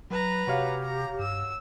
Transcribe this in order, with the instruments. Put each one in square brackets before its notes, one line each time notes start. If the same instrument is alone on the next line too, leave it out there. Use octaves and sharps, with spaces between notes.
[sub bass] F#3 [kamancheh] B4 A#5
[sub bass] C3 [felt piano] F#4 C#5 F5 [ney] G4
[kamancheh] A#5
[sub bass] G2 [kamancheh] E6